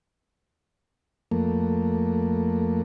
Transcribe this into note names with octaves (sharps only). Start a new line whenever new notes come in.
F2 A3 A#3